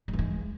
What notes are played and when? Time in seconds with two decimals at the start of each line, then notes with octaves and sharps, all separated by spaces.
0.08 G3
0.13 E3
0.19 G#3